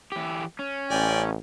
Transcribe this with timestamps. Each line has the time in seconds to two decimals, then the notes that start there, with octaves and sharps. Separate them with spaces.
0.12 E3 G4
0.59 C#4
0.90 A1 D5 G5 G#5